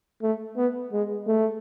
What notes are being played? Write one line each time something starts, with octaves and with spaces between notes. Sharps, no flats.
A3
B3
G#3
A3